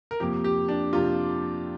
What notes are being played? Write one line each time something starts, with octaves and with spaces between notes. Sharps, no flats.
A#4
F2 C3 A#3 G4
G4
D4
F2 C3 A#3 F4